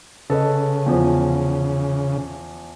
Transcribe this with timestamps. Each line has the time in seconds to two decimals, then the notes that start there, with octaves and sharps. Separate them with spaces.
0.30 C#3 A4 B4 D#5
0.86 E2 F3